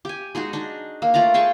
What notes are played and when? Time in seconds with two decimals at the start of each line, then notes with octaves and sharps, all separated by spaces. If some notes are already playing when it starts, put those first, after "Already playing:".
0.05 G4 G#5
0.35 G#3 D#4 F#4 G#4
0.53 D4 D#4
1.02 A#3
1.14 A3 F4 D5 A#5
1.34 G#4 G5 A5 C#6